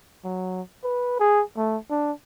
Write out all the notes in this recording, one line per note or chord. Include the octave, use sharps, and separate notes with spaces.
F#3
B4
G#4
A3
D4